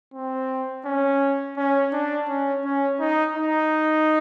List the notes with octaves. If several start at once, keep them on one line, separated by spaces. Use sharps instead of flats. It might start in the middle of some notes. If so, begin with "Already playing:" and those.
C4
C#4
C#4
D4
C#4
C#4
D#4
D#4